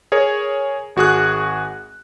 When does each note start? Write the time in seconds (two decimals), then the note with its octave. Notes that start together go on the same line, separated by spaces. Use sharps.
0.12 G#4 A#4 C#5
0.96 G#1 F#4 G#4 F#6